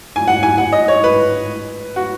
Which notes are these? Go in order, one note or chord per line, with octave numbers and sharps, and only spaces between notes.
G#5
F#5
G#5
F#5
D#5
C#5
B4
F#4